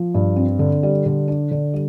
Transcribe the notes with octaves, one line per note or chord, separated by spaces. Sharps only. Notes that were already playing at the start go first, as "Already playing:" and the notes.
Already playing: F3
G2
C4
D3
G3
D3
D4
D3
G3